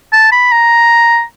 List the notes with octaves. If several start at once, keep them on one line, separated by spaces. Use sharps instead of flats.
A5
B5
A#5